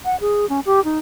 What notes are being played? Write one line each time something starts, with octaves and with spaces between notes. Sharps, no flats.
F#5
G#4
C#4
G4
D#4